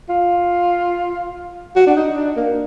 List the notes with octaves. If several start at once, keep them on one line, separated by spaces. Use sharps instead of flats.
F4
F#4
D4
D#4
D4
A#3